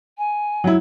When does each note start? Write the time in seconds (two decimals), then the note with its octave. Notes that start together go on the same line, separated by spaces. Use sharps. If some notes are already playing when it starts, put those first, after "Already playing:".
0.18 G#5
0.64 F#3 E4